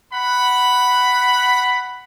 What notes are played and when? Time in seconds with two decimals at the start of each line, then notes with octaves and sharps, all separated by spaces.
0.12 F#5 B5